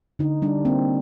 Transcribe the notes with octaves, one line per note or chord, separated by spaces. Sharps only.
D3 D#4
G3 D4
A#3 C4